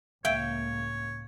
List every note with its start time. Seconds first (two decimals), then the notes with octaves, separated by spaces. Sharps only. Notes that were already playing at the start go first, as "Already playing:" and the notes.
0.25 C#2 A2 A#3 C#5 E5 F5 G5